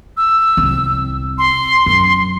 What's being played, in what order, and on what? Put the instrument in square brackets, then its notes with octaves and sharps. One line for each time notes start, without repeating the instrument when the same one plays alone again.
[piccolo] E6
[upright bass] C2 C4
[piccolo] C6
[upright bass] F#2